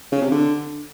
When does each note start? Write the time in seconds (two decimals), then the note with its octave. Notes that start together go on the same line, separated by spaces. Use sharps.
0.12 C#3
0.22 C3
0.32 D3